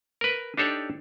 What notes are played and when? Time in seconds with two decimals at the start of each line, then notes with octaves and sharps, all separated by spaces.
0.21 A#4 B4
0.58 D4 D#4 G4 A4 C#5 D5